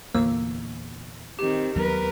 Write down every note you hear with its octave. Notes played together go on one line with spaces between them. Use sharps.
E2 A#2 D3 A#3 E6
D#3 C4 G4
D#2 F#3 B3 A#4 B4